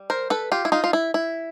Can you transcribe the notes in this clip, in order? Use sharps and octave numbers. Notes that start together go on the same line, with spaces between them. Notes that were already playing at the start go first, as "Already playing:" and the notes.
Already playing: G3
A#4 C5
A4 B4
F4 G4
E4
D#4 F4
F4
E4
E4